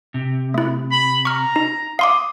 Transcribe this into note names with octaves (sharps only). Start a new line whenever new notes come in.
C3
A3 E4
B5
A#5 C#6 F6
D#4
F5 C6 D6 D#6